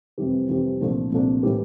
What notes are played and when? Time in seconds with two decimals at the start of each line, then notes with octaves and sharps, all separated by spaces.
0.18 F2 C3 E3 G3
0.49 F2 C3 E3 G3
0.81 C2 A#2 F3 A3 D4
1.12 C2 A#2 F3 A3 D4
1.43 A2 E3 G3